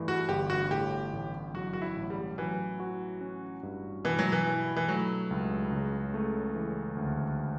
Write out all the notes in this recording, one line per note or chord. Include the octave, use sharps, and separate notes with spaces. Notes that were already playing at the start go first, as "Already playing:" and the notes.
Already playing: G2 E3 A3
F#4
G1 G4
F#4
A2 G4
A1
F#3 F#4
F#4
E4
A1
G3
E3 F#3
F#4
C#4
G2
B2 E3
F#3
E3
E4
E3
F#3 A3
C#2
C#3
A3
E3
D2